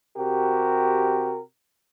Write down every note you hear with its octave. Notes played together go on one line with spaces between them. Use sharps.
C3 F#4 G4 A#4